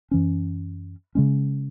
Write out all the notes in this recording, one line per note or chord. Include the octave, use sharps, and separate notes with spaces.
F#2 E3 C#4
C#3 G#3 C#4